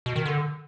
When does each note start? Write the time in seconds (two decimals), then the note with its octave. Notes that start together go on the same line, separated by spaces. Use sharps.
0.06 B2
0.16 D#3
0.25 D3